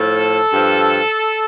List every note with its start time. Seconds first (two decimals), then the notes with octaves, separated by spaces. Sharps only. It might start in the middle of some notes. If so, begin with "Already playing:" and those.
Already playing: A2 F3 A4
0.52 G2 F3